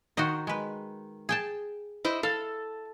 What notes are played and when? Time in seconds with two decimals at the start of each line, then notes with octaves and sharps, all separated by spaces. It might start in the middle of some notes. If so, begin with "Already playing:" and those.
0.17 D#3 F#4 C5 D#5
0.47 G#3 B4
1.29 G#4 G5 A5
2.05 E4 C5 D#5
2.23 A4 F5